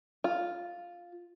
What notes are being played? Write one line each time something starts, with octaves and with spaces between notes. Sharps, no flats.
F4